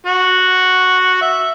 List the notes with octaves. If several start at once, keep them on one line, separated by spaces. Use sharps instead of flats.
F#4
E5